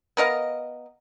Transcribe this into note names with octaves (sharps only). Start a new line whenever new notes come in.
B3 A#4 D#5 F5